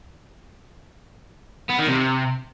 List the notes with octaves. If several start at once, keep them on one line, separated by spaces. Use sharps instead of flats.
B3
D#3
C3